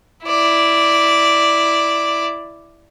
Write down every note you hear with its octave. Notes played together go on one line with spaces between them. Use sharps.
E4 D5